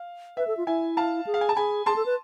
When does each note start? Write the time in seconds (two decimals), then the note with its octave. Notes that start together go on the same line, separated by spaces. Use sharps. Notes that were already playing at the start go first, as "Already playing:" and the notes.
Already playing: F5
0.37 B4 E5
0.47 A4
0.57 F4
0.67 E4 E5 G#5
0.97 F5 A5
1.27 G#4
1.34 F5
1.41 G#5
1.49 A5
1.56 G#4 G#5 B5
1.86 G#4 A5 C6
1.96 A4
2.06 B4